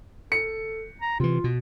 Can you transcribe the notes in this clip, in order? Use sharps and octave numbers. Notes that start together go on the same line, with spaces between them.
A4 C#7
A#5
C3 E3 F4
B2